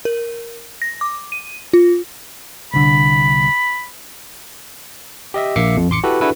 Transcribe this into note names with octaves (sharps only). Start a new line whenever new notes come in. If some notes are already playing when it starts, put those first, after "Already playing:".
A#4
A#6
D6
D#7
F4
C2 D3 B5
G4 D#5 E5
A#1 A#3 E5 D6 C7 C#7
F2
A1 C6 D6 C#7
E4 F#4 G4 A4 B4
D4 E4 F#4 G#4 A4 B4